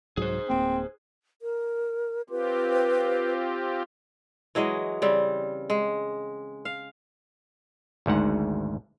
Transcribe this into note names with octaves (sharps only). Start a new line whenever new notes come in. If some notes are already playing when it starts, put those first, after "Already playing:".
C2 G#2 F#3 G#4 C5
D1 A#3 C4
A#4
C4 F4 G4 B4
E3 F#3 G#3 D#5
C#3 G3 C4
G#3
F5
G#1 D2 G#2 F#5